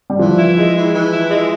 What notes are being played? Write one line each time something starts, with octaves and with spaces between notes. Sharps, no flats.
G3
E3 F3
E4
G#3
E3
E3
E4
G#3